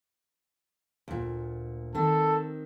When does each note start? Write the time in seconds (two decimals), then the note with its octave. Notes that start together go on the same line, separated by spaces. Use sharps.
1.08 D2 A#2
1.95 D#3 C4 A4